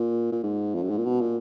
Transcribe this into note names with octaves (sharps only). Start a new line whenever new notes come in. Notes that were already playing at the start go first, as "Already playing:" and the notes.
Already playing: A#2
A#2
G#2
F2
F#2
G#2
A#2
B2
A#2